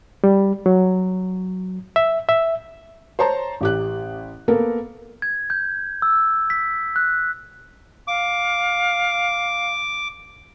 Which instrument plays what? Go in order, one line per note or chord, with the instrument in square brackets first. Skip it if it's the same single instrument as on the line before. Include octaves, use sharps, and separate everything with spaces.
[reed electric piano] G3
F#3
E5
E5
[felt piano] C5 C#5 A5 A#5 C6
A1 G4 F#6
A#3 B3 A4 A#4
[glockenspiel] G#6
G6
E6
B6
F#6
[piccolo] F5 [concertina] D6